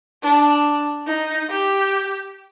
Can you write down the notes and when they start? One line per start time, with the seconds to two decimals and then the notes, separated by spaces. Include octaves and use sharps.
0.23 D4
1.07 D#4
1.49 G4